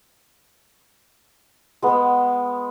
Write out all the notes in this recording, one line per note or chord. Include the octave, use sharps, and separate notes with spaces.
G#3 B3